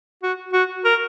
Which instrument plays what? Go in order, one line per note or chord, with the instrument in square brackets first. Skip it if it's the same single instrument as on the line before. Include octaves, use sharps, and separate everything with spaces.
[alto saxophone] F#4
F#4
A#4